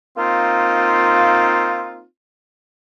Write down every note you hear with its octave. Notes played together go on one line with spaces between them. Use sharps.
A#3 C4 D#4 F4